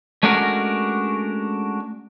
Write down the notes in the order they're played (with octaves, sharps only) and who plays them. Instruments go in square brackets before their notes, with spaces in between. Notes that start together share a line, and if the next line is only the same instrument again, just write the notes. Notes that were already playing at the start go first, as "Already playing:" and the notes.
[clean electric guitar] G#3 A3 C#4 D4 F#4 A#4